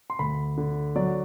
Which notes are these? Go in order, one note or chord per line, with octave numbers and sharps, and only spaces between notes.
C6
D2 B5
D3
F#3 D5